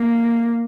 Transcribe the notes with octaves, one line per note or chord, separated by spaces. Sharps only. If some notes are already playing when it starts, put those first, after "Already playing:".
Already playing: A#3